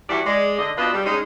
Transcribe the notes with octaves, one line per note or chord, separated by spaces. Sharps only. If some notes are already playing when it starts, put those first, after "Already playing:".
E3 G3 F#4 D5
G#3 D5
D3 D#5
B2 F3 D4 B4 C5 D#5
G3
G#3 C#4 D#4